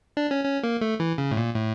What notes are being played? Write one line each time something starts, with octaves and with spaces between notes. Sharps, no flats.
D4
C#4
C#4
A#3
A3
E3
C#3
A2
A#2
A2